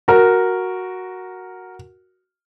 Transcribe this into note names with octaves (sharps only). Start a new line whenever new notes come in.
F#4 A#4